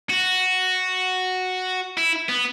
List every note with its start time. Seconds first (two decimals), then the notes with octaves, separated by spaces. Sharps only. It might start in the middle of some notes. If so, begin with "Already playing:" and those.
0.09 F#4
1.98 E4
2.29 B3